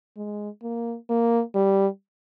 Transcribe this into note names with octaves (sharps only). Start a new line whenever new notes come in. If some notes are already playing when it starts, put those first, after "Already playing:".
G#3
A#3
A#3
G3